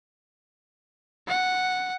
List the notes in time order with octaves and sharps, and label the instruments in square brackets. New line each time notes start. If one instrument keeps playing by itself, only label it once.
[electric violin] F#5